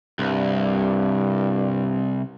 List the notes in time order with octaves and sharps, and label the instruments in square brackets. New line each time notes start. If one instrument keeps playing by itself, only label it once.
[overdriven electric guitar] C2 [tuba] G2